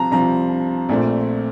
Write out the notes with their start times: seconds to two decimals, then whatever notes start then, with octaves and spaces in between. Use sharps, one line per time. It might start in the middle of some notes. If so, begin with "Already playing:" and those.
Already playing: C2 C3 F3 C4 A5 A#5
0.11 C2 C3 F3 C4 A#5
0.89 A#1 A#2 A3 C4